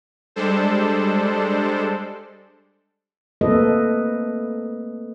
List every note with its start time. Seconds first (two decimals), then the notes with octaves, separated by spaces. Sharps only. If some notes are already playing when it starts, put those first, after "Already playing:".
0.36 G3 G#3 D4 A4 C5
3.41 A3 A#3 C4 A4 B4 D#5